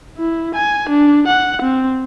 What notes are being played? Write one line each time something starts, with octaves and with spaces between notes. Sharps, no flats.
E4
G#5
D4
F#5
C4